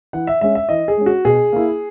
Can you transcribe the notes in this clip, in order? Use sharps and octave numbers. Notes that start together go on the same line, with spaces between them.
E3 F#5
E5
G#3 C#4 E5
E5
E3 D#5
G#4
G#3 C#4
F#4
B2 G#4
A#3 E4